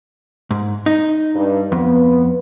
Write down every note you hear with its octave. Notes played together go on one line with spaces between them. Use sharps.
G#2
D#4
G2
F2 B3